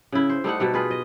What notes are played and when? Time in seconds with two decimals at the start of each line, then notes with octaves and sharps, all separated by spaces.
0.12 C#3 E4
0.29 C5
0.44 G3 A3 D#4 F#5
0.60 B2 G3 A3
0.74 F4 G#4 B4
0.91 D#5